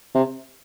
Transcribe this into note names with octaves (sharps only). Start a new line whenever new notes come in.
C3